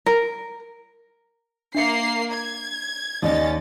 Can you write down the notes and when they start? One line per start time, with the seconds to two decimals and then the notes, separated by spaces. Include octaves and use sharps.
0.06 A#4
1.75 A#3 D4 E5 C7 C#7
2.31 G#6
3.22 D#2 C#4 D5 D#5 A6